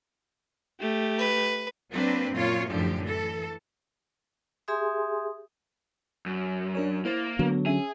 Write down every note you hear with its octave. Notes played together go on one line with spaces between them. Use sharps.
A3 G4
B4
F#3 A#3 C4 D4 B4
F#2 A#2 F4 C#5
F#2 A2 D3 F3 G4
E3 A4
G4 G#4 E5 G#5 C6 D#6
F#2
D4 A#4 C#5
A#3 E4 C5 A6
D3 F#3 B3
C#4 G#4 E5